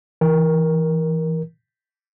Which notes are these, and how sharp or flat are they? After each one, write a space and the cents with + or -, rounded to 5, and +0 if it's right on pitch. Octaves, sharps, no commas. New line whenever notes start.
E3 +0 A#4 +10